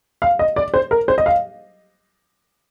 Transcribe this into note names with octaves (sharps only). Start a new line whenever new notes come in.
F5
D#5
D5
C5
A#4
C5
D#5
F5